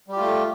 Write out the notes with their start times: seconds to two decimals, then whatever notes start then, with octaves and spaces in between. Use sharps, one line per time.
0.08 G3
0.12 G4
0.16 F4
0.20 A3